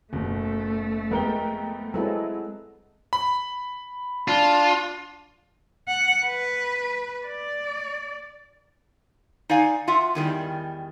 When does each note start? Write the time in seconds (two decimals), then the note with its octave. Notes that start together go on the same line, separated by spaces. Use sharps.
0.13 F#1 B2 A3
1.11 F2 G#3 B3 A#4 G5
1.94 F#3 G#3 C4 E4 A4 B4
3.13 B5
4.28 D4 F4
5.88 F#5
6.26 B4
7.26 D5
9.50 D#4 D5 F5 G#5
9.88 F4 E5 F#5
10.15 E2 D#3 G3